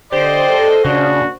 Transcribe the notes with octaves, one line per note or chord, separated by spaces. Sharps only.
D3 G4 C5 D5 D#5
A4
A#2 C#3 C#4 D4 F#4